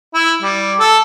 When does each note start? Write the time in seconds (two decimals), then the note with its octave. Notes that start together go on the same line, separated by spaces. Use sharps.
0.14 E4
0.43 G3
0.80 A4